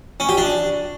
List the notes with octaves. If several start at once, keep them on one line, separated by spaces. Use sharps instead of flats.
C#4
G4
D4